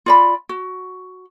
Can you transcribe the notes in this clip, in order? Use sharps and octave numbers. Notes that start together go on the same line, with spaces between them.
F4 D5 B5
F#4